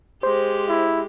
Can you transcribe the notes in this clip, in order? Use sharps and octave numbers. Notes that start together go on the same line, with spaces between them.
G#3 G4 C5
E4